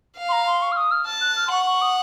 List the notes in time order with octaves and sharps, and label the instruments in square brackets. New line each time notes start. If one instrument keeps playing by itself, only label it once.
[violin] F5
[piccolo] C6
A#5
C6
C#6
F6
D#6
F6
[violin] A5
[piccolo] F#6
F6
C6
[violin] F#5 [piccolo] C#6
[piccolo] C#6
D#6